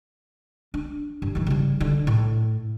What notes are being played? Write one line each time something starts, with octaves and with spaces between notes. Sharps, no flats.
D4
G2
D#2 F3
C#3 G3
D3
A2